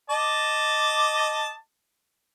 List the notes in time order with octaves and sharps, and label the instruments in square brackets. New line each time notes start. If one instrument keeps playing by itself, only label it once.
[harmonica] D#5 A5 D6